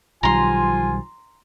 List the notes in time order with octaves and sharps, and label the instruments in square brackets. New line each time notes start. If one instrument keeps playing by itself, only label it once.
[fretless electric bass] B1 D#3 G3 [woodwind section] F3 F4 [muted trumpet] G#5 [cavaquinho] A#5 C6